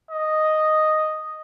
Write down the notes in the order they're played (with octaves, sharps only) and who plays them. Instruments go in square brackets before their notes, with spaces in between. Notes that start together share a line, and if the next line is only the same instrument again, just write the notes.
[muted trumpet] D#5